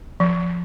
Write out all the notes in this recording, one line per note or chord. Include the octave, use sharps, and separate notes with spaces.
F3